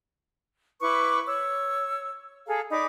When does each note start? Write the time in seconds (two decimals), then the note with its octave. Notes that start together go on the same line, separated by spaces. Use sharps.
0.81 E4 B4 C#6 D6
1.26 C#5 E6
2.47 G#4 A4 F5 A#5
2.70 D#4 D5 B5 D6